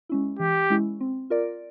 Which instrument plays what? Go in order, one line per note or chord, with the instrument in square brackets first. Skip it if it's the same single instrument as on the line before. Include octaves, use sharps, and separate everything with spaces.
[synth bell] G#3 C#4 E4
[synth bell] E3 [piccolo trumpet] G4
[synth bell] G#3 C#4 E4
C4
F4 A#4 D5